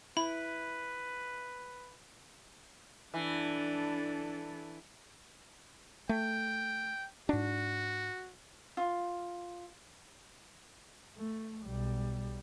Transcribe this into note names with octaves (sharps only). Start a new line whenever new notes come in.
E4 B4 B5
E3 D4 A4
A3 G5
G#2 D4 F#4
F4
A3
B1 G3